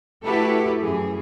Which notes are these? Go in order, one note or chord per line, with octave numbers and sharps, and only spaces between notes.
A3 E4 F#4 G4 A4 B4
F#2 E3 G#4